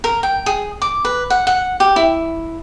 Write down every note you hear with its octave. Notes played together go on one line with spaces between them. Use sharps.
A#4
G5
G#4
D6
B4
F#5
F#5
G4
E4